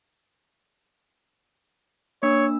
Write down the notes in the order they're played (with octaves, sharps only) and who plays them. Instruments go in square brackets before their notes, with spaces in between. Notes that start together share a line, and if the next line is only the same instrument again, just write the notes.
[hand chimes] A#3 D4 E6 [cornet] C#5